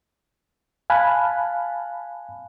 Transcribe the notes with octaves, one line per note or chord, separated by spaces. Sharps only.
F5 G#5 A5 B5 F#6